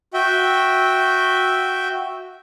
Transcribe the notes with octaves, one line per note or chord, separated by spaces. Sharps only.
F#4 E5 G5